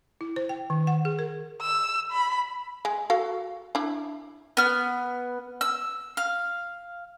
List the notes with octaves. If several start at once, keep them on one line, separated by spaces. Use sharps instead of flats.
E4
C5
G5
D#3
F#5
G#4
A#4
E6
B5
G#3
F#4 A4 F5
D4 E4
B3 F6
E6
F5